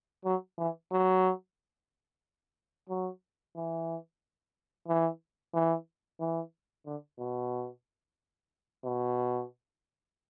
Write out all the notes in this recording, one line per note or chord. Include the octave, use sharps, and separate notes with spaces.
F#3
E3
F#3
F#3
E3
E3
E3
E3
D3
B2
B2